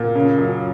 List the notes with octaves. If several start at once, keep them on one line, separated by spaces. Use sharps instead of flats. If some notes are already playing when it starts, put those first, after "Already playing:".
Already playing: A#2
C#3
F#2